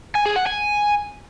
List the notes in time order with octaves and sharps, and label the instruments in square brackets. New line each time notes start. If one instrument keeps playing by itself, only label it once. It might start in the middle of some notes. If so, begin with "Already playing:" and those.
[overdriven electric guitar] G#5
G#4
F#5
G#5